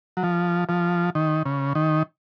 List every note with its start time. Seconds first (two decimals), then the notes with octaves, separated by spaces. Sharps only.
0.17 F#3
0.23 F3
0.69 F3
1.15 D#3
1.45 C#3
1.75 D#3